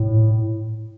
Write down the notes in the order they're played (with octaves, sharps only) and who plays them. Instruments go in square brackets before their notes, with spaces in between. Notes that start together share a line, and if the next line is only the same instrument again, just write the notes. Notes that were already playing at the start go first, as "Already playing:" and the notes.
Already playing: [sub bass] A2